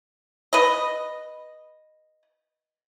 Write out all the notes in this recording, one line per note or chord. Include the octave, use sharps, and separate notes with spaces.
B4 D#5